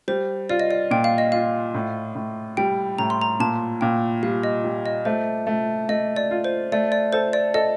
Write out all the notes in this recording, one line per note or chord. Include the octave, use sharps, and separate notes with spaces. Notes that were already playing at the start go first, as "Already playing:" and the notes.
G3 C5
F4 D5
D#5
D5
A#2 G5
F5
D#5
F4 F5
A2
A2
G3 G5
A2 A#5
C6
A#5
A#2 A5
A#2 G5
G3 F5
D#5
G3
D#5
A3 C5
A3
A3 D#5
D5
F4
C5
A3 D5
D5
A4 C5
D5
A4 D#5